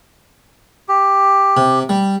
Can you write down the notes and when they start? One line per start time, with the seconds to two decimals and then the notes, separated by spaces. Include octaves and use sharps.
0.89 G4
1.57 C3
1.89 G3